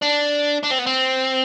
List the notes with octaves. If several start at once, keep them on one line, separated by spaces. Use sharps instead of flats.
D4
D4
C4
B3
C4